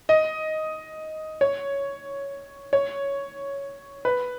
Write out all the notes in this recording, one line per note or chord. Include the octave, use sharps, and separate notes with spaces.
D#5
C#5
C#5
B4